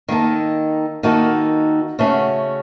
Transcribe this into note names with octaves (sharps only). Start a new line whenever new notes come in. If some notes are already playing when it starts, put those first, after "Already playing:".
D#3 A#3 D#4 A4
D#3 A#3 D#4 F#4 A4
C#3 A3 C#4 F#4